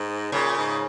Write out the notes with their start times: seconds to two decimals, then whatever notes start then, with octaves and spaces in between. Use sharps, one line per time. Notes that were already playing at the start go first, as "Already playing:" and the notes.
Already playing: G#2
0.32 A#2 C#3
0.57 G#2